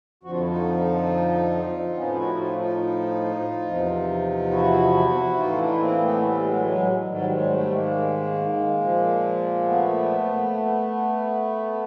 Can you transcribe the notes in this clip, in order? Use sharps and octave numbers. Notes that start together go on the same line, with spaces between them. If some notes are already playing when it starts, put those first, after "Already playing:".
F2 D3 F3 F#4
F4
E4
D#4 F4
C4
A2 F3 B3 C#4
E4 F#4
D#4 F4
D#4 F4
E2 C3 F3
E4 F#4
A2 E3 D#4 F4
D4 E4
A#3 C4
A3 B3
G3
F#3 G#3
F#3 G#3
G#2 D#3 F#3 G3
F#3 G#3
G3 A3
G#3 A#3
A#2 F3
A3 B3